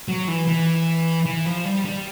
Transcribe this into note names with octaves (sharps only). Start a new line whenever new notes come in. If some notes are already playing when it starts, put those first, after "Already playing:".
F#3
E3
E3
E3
F3
G3
G3